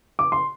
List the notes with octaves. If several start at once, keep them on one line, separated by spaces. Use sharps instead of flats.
D6
C6